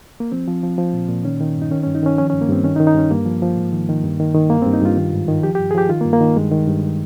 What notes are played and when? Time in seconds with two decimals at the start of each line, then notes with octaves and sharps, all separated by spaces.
0.20 A#3
0.32 F3 C4
0.48 F3
0.63 F3
0.78 F3
0.93 A#2
1.09 A#2
1.24 D#3 C#4
1.40 D#3
1.56 G2
1.62 D#4
1.71 D#3 C#4
1.83 G2 C#4
1.95 D#4
2.03 D#3 C#4
2.18 F3 C#4
2.30 G2 C#4
2.41 A#3
2.49 G2 C4
2.64 D#3 C#4
2.76 D#4
2.80 D#3
2.87 D#4
2.95 G2 C#4
3.11 G2 A#3
3.26 F3
3.42 F3
3.57 G#2
3.72 D#3
3.89 D#3
4.03 G2
4.19 D#3
4.35 D#3
4.50 G2 A#3
4.62 G2 C4
4.73 D#4
4.81 G2 F4
4.97 D#3
5.12 G#2
5.28 D#3
5.43 F3 G4
5.55 G2 G4
5.71 G#4
5.75 F3 G4
5.89 D#3 F4
6.01 A#3
6.05 G2
6.13 A#3
6.20 D#3
6.36 G2 G#3
6.51 D#3
6.67 G2
6.83 D#3